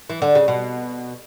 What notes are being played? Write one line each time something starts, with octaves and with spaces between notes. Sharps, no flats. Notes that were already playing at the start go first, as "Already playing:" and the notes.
E3
D3
C#3
B2